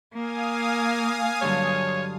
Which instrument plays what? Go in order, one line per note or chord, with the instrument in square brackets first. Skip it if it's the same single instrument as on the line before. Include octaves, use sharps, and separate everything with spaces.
[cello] A#3 [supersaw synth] F5 G#5 D#6
[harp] G2 D3 F#3 [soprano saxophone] C#5